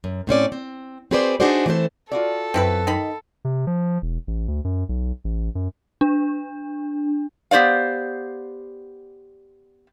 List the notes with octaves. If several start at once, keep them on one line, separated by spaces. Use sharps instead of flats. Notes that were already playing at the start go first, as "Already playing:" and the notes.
F#2
A2 C4 C#4 D5
C4
C4 F#4 G#4 B4 C5 D5
D4 D#4 F#4 G#4 C5 D5
E3 A3 C4 A4 C5
F4 F#4 A4 D5
F#2 C4 E4 B4
D#3 D#4 B5
C3
F3
E1
A1
D2
F#2
B1
A1
F#2
D4
B3 G4 C5 D5 F5